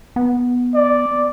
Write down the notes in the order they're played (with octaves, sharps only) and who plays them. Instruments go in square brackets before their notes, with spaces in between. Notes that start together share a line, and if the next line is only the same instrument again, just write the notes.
[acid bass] B3
[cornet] D5